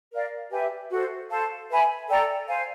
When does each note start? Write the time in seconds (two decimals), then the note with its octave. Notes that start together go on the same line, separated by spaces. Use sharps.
0.11 A#4 D5 F5
0.50 G4 B4 E5 G#5
0.90 F#4 A4 C5
1.29 A4 C5 F5 A5
1.70 B4 E5 G#5 B5
2.09 A4 D5 G5 A#5
2.48 C5 F5 G#5